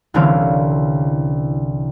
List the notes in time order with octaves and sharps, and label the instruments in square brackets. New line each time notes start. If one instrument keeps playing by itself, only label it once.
[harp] C2 D3 E3 C4 C#4 F5